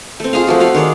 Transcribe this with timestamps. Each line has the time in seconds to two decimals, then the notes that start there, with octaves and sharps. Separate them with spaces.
0.20 A3 C4
0.33 F4 G#4 D#5 F5
0.47 F3 A3 F#4
0.60 F4 F#4 F5 F#5
0.75 D#3 G#4 C#5 D5